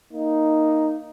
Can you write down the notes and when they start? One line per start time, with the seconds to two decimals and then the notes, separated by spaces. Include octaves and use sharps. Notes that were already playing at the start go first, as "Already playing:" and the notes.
0.13 A#3 D#4